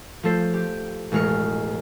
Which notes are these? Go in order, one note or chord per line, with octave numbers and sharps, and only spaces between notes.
F3 A3 A4 C5
G4
E1 A1 G#3 F6 C#7